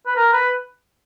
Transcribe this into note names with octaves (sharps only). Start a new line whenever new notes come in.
B4
A#4
B4